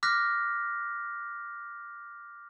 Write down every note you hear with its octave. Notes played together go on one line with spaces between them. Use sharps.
D6 F6 F#6 A#6 B6